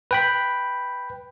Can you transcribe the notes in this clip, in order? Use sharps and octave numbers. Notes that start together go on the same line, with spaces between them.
B4 G5 B5